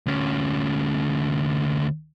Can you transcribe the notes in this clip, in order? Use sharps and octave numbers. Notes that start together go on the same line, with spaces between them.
D2 C#4